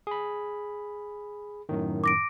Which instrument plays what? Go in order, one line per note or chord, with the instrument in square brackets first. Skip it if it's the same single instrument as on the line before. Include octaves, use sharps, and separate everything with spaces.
[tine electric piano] G#4 B5
F#2 A2 D#3
[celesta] D6 A#6 D7